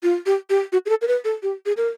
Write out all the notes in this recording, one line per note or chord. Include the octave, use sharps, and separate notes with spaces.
F4
G4
G4
F#4
G#4
A4
A#4
B4
A4
G4
G#4
A#4